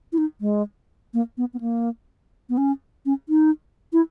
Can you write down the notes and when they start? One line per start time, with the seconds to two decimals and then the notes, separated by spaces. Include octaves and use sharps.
0.13 E4
0.18 D#4
0.41 G#3
1.14 A#3
1.37 B3
1.54 B3
1.61 A#3
2.49 B3
2.57 C#4
3.06 C#4
3.29 D#4
3.93 E4